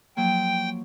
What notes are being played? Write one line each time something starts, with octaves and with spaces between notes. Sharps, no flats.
F3 F#3 A#3 G5